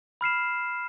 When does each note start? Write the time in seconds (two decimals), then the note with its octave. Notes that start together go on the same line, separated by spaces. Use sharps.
0.21 B5 F6 C7 E7